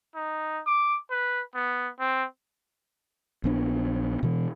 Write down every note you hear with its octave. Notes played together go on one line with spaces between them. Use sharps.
D#4
D6
B4
B3
C4
A#1 B3 D4
B2 E3